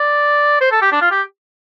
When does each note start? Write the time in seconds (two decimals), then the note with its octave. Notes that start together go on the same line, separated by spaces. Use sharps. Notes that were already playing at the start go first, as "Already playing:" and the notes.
Already playing: D5
0.61 C5
0.72 A4
0.82 G4
0.92 D4
1.01 F4
1.11 G4